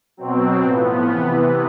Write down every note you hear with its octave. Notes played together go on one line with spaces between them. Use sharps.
B2 F#3 C4
A2 F3 B3
C3 E3